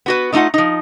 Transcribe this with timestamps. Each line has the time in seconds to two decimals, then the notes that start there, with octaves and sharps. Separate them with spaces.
0.06 B3 F#4 B4
0.32 D3 A3 D#4 F4 F#5
0.54 F3 D#4